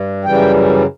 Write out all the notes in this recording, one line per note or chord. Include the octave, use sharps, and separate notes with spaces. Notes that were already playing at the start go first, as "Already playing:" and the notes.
Already playing: G2
F#2 C#3 E3 G3 G5